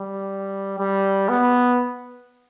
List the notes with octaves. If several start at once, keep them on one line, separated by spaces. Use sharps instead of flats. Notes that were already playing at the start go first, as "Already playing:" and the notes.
Already playing: G3
G3
B3